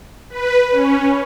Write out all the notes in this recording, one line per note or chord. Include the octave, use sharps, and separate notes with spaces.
B4
C#4